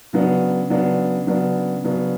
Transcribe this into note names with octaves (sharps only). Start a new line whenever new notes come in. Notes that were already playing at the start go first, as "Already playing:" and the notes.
C#3 F#3 B3 D4
C#3 F#3 B3 D4
C#3 F#3 B3 D4
C#3 F#3 B3 D4